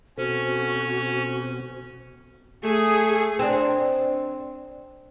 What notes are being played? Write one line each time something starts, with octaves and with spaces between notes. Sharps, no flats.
B2 C4 C#4 F#4 A4 C5
A3 G#4
C4 D4